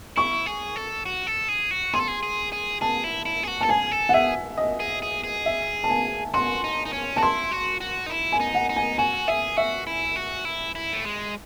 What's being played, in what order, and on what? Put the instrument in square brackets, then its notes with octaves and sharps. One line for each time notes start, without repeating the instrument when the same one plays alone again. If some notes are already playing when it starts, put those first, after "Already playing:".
[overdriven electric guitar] E4 [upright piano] C#6
[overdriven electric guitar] G#4
A4
F#4
A4
G#4
F#4
[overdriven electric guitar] G#4 [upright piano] C6
[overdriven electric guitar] A4
G#4
G#4
G#4
[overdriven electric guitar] G#4 [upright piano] A5
[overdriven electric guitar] E4
E4
G#4
F#4
[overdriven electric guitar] A4 [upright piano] A5
[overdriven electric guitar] G#4 [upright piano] G#5
[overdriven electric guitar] A4
[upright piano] F#5
[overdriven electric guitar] G#4 [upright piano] E5
[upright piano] D#5
[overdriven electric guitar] G#4
G#4
G#4
[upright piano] E5
A5
G#5
[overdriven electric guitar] F#4 [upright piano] C6
[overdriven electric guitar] D#4
D#4
C#4
[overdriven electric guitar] F#4 [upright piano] A5
[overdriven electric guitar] E4 [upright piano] C6
[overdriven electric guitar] F#4
F#4
D#4
E4
[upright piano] G#5
[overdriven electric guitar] D#4
[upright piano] F#5
[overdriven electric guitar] D#4
[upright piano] G#5
[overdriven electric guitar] F#4 [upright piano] G#5
[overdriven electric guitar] G#4 [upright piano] E5
[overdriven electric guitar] F#4 [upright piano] E5
[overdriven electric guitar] E4
F#4
E4
E4
A3
G#3